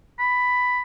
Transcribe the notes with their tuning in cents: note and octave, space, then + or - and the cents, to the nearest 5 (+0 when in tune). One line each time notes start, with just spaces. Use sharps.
B5 +5